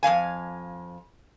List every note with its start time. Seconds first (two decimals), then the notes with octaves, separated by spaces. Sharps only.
0.03 F2 C4 F5 G#5